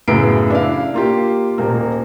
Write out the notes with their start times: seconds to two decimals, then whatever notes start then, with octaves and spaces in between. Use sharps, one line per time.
0.08 F#2 A2 C#3 B3 C7 D7
0.50 D4 E4 F5
0.94 A#3 F4 G4
1.58 D#1 A#3